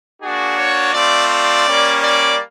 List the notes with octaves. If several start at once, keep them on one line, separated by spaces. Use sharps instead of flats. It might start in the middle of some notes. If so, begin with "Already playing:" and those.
A#3 D4 F#4 G#4
C#5
A3 C4 F4 D5
D5
G3 A#3 C#4
D5